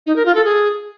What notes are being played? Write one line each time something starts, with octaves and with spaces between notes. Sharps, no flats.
D#4
A#4
F4
A4
G#4